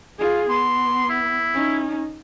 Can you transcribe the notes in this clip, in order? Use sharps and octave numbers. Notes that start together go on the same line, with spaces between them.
F4 G#4
B3 C6
E4
C#4 D#4